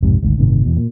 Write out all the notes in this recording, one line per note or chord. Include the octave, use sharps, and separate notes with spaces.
B1 F2 G#2 C3
G#1 D2 G#2
G1 A2 C3 D#3
E2 B2
A#2